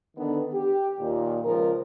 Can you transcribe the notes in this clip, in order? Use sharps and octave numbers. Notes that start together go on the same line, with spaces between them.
D3 D#3 B3 D4
G4
D#2 A#2
C#2 F3 A#4